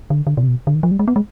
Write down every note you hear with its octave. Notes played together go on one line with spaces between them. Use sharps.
D3
D3
B2
C3
B2
D3
D#3
F3
G3
G#3
B3
G#3